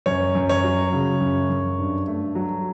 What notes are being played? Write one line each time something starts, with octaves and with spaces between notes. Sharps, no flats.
F#2 C#5
F#2
C#5
F#3
C#3
F#2
F#2
G2
A3
F#3